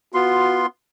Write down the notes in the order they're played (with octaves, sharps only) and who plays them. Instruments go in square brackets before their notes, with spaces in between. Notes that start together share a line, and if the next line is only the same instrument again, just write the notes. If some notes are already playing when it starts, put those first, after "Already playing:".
[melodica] B3 F4 C6 [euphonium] F#4